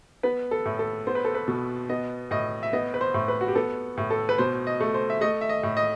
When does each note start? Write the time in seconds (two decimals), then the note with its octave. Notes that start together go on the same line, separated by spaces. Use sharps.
0.23 B3 B4
0.51 A4
0.65 A2
0.79 A4
1.07 B3 C5
1.15 B4
1.25 A4
1.34 B4
1.48 B2
1.89 B3 D#5
2.31 A2 D#5
2.63 E5
2.73 B3 D#5
2.94 B4
3.01 C5
3.14 A2
3.28 B4
3.41 F#4
3.48 G4
3.55 B3 A4
3.97 A2
4.10 A4
4.29 B4
4.38 B2 C5
4.67 D#5
4.81 A3
4.94 C5
5.10 E5
5.21 A3 D#5
5.41 E5
5.49 D#5
5.63 A2
5.77 D#5